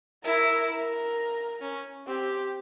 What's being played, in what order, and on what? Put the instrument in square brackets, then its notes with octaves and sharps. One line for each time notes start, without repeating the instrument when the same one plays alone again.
[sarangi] E4 [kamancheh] A#4
[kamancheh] A#4
[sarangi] C#4
[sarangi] C4 [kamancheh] G4